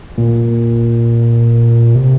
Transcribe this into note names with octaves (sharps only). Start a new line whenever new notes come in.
A#2
C3